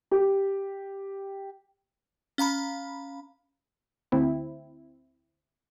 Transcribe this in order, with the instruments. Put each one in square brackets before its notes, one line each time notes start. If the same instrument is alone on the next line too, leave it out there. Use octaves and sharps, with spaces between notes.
[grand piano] G4
[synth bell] C#4 F5 A#5 B5
[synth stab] D2 C4 E4